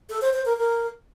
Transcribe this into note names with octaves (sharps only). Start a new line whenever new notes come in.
A4
C5
C5
A#4
A#4